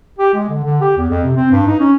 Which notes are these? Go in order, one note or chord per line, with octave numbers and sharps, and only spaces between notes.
G4
G#3
D3
D3
G4
E2
F2
C3
C4
G2
D#4
C#4